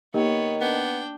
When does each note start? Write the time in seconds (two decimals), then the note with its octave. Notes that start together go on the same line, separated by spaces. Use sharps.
0.14 D#3 A#3 B3 D#4 G4 C#5
0.61 B3 D4 G5